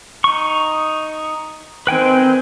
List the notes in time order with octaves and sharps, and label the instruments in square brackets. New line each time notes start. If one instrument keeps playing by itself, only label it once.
[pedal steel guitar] D#4 C#6
[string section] D#3 C4 [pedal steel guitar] B4 G5 G#5